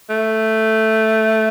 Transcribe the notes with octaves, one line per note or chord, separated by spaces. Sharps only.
A3